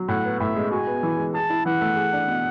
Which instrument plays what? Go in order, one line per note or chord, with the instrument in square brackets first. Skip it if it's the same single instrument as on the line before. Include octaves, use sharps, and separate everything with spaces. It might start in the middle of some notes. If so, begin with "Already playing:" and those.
Already playing: [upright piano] F#3
[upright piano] A2 [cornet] F#5
[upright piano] B3
[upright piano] A2 [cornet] E5
[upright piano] G#3
[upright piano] F#4 [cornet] G#5
[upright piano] B3
E3
G#3
[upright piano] G#4 [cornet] A5
[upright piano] E4
[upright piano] E3 [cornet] F#5
[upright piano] A3
G#4
D4
B2